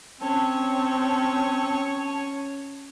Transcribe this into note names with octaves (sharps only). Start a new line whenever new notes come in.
C4 C#4 C#5 A5